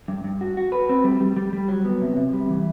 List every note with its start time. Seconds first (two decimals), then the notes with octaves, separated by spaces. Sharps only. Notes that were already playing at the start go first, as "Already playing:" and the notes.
0.08 G2
0.24 G2
0.41 F#4
0.57 F#4
0.72 B4
0.89 C4
1.04 G3
1.20 G3
1.36 G3
1.53 G3
1.68 F#3
1.85 B3
2.01 C3
2.17 C3
2.33 G3
2.49 E3